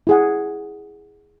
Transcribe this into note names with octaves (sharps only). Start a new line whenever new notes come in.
E4 G#4 F#5